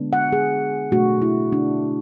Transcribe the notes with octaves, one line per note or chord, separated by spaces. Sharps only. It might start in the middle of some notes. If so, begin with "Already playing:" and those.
Already playing: D3 G#3 B3 D4
F#5
G#4
B2 A3 D4 F#4
E4
D4